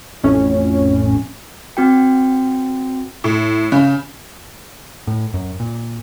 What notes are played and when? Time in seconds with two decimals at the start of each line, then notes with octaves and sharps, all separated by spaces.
0.23 A1 F2 A2 C#4
1.77 C4 F#4 G5
3.24 A2
3.72 C#3
5.07 A2
5.34 F#2
5.60 A#2